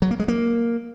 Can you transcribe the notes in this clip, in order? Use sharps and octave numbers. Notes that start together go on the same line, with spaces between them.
F#3
A#3
G#3
A#3